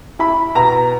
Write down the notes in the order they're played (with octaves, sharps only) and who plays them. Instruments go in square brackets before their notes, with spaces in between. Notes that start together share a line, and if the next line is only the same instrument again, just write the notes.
[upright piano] E4 B5
B2 A#5